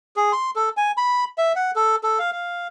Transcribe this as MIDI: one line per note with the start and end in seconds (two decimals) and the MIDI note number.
0.16 0.32 68
0.32 0.51 84
0.56 0.69 69
0.77 0.91 80
0.97 1.24 83
1.38 1.53 76
1.56 1.71 78
1.76 1.96 69
2.03 2.19 69
2.19 2.31 77
2.32 2.68 77